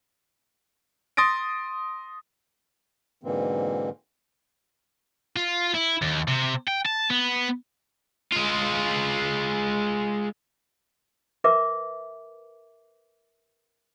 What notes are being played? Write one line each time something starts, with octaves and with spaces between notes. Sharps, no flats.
C6 D#6 A6 A#6 D7
G#2 B2 D3 E3 A#3 C4
F4
E4
D#2
C3
G5
A5
B3
G#3 F4
A#4 B4 E5 D6